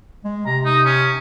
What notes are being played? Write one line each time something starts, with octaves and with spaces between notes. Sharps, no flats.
G#3
C3 A#5
D#4
C#4